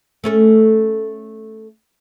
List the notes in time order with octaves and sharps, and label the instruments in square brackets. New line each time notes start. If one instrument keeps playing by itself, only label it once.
[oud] A3 C#4 A4